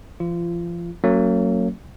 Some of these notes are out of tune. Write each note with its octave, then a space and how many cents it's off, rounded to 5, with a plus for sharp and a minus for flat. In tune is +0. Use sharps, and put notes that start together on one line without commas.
F3 -35 F4 -25
F#3 +0 A#3 -35 C#4 +0